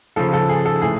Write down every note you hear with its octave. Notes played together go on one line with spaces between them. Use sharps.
C#3 F3 A4
A4
G#4
A4
A2 E3 G#4